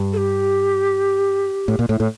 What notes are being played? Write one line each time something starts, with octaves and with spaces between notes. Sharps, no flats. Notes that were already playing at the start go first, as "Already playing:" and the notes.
Already playing: G2
A4
G4
A2
A#2
A2
A2